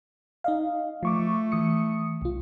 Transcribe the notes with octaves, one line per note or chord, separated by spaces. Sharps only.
D#4 D#5 F5
F3 A3 C#6 D6
E3 D#6 C#7
C2 F4